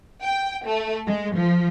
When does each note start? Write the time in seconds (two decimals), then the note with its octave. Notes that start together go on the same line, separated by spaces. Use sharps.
0.23 G5
0.66 A3
1.07 G#3
1.36 F3